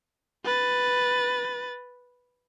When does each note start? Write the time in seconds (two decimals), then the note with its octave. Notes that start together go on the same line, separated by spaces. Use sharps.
0.45 B4 A6